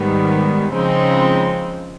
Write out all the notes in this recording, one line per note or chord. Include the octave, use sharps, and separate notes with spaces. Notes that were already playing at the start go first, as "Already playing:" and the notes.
Already playing: G#2 D#3 G3 B3
C#3 F3 G#3 C4 D#4